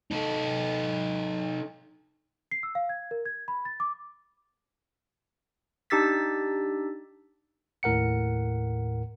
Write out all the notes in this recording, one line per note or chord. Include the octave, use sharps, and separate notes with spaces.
D#4 A4
C7
E6
F5
G#6
A#4
G#6
B5
A6
D6
D4 D#4 G4 E6 A6 B6
D#2 A2 A#4 F#5 C#7